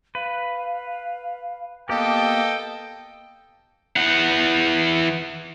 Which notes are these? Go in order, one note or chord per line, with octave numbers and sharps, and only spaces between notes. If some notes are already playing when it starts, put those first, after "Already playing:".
B4 F5
A#3 B3 G4 A4 D#5 F5 G5
E3 F#5